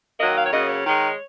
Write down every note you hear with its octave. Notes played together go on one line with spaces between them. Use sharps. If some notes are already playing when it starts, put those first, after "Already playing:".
D#3 F#3 A#3 D#5
F5
C#5
C#3 F#3 A#3 D#5
C#5
D#3 G#3